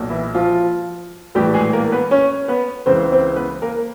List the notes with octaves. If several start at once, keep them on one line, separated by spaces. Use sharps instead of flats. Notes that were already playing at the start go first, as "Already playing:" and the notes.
Already playing: B1 A#2
E3 E4
F3 F4
A#1 A2 E3 G3 G4
G#3 G#4
A#3 A#4
B3 B4
C#4 C#5
B3 B4
C#2 C#3 E3 C4 C5
C4 C5
B3 B4
A#3 A#4